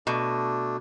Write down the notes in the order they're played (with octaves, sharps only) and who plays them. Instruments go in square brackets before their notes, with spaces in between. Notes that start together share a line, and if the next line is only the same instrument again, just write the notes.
[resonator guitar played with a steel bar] B2 [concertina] A3 D4